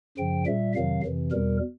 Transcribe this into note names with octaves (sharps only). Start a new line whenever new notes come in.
F#2 C#3 F3 G5
A#2 G3 E5
F2 C3 D#3 F#3 F5
F2 C3 E3
E2 B2 G3 A#4